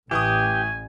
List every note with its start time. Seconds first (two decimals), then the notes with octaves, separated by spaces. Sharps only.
0.11 A1 E3 G4 G#5 C#6 D#6